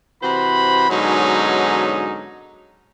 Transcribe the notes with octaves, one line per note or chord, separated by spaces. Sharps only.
C3 E3 F#4 C5 B5
G#2 B2 D3 F#3 C#4 D#4